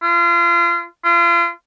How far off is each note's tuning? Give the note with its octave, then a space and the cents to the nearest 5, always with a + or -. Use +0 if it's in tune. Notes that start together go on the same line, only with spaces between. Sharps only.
F4 -30
F4 -35